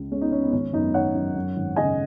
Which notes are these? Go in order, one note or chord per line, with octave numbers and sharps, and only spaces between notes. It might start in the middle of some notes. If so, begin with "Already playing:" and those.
Already playing: C#2 C#3
G#3 C#4
B3 D#4
G#3 C#4
B3
G#1 C#4
F#2 B3 D#4
D#3 C#5 F#5
F#2
F#2
G#1
C#3 D#5 G#5